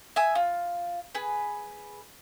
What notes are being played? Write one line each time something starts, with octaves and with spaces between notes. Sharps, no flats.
E5 G#5 D#6
F4
G#4 B4